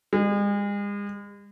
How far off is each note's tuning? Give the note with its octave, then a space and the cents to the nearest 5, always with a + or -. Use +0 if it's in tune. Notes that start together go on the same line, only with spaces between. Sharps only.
G#3 -40